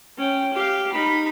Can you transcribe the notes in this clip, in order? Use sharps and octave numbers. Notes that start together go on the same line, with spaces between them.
C#4 G5
G4 F5
D#4 B5